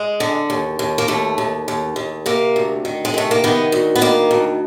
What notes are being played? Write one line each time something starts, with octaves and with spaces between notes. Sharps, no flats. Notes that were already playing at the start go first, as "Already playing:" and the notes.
Already playing: G#3
D3
D#2
D#2
A#3
D#2 A3
D#2
D#2
D#2
C3 A#3
D2
D#3
G#3
C3 A3
A#3
D#3 B3
D2
B3
D#3 A#3
D2